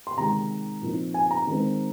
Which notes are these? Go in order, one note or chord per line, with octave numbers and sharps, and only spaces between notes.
C6
C3 D#3 G#3 A#5
A#2 F3 C4 D#4
G#5
A#5
D#3 G#3 C4